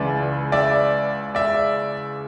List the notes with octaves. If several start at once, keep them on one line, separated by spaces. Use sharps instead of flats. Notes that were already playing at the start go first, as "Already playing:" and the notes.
Already playing: C#2 C#3 E3 D5 E5
D5 E5
D5 E5